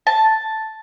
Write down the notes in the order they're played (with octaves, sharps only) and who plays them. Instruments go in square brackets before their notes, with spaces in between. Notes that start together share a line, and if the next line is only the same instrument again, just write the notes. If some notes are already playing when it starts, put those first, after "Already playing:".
[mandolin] A5